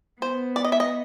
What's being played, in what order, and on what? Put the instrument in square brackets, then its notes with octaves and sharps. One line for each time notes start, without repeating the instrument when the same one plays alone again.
[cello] B3 [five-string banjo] C5
[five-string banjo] D5
D#5
E5
D#5